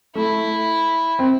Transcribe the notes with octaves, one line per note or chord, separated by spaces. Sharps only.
A3 E4
C4